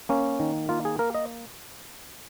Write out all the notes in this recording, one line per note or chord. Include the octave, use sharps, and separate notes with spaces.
A#3 C#4
D#3
A#3 F4
G#4
A#3 A#4
D#5